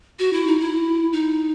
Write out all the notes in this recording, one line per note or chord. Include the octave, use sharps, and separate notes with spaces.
F#4
E4
D#4
E4
D#4